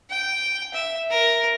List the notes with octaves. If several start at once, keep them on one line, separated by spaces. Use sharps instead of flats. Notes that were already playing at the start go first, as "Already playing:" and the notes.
G5
E5
A#4